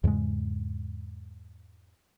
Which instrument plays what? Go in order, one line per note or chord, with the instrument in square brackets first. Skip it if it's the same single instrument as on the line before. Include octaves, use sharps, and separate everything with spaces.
[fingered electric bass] E2 G#2 C#3 G#3